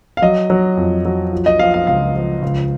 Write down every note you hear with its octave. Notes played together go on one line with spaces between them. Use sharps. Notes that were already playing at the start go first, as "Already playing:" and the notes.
F5
F#3 D#5
F#3
F2
F#3
F3
D#5
F3 F5
F5
C#2 F5
F3
C#2